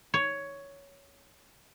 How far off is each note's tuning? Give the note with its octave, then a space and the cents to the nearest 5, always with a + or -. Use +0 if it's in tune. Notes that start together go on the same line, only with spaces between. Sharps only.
C#5 +10